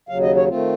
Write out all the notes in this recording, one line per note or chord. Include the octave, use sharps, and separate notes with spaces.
D#2 C#3 F#3 F5
D#5
C#5
D#3 A3 C4 F4